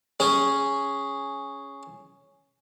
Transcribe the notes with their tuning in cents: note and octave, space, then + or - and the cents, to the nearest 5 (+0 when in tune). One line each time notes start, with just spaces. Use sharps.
C#4 +0 G#4 +0